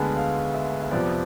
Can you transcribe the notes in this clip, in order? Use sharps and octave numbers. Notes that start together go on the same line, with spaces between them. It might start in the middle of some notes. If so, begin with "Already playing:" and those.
Already playing: D2 D3 G#3 B3 G#5 A5 B5
F5
E5
E5
F2 C3 F3 B3 D5